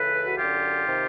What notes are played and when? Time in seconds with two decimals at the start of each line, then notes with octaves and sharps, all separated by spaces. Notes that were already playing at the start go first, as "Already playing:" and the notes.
Already playing: C#2 C#3 E3 A4 B4
0.26 F#4
0.38 F#2 D3 F4 G4
0.86 C3 D#3